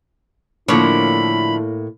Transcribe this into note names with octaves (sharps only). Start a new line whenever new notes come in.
A2 D3 F3 A#3 E4 C#5 B5